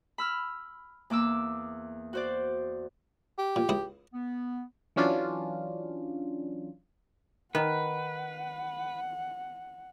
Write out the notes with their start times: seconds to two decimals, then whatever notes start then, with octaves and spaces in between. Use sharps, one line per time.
0.18 B5 E6 F6
1.10 E2 A#3 D6 E6
2.13 F#4 C5 D5
3.38 G4
3.56 A#2
3.69 C#2 E4 D#6
4.13 B3
4.96 E3 F#3 C#4 D4 F4
7.55 D#3 B4 F#5